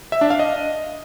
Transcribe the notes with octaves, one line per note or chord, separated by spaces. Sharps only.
E5
D4
F5
D#5